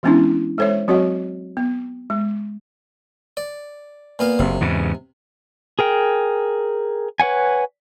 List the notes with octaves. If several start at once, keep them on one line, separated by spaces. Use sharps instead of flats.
E3 G#3 B3 C#4 D4 E4
G#3 A4 C5 C#5 E5
F#3 C4 F#4 C#5 D#5 F#5
B3
G#3
D5
A#2 B3 F5
F#1 C3
E2 G#2 C#3
G#4 A#4 G5
B4 C#5 F#5 G#5